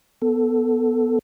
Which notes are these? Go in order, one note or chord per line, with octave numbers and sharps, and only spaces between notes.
B3 A4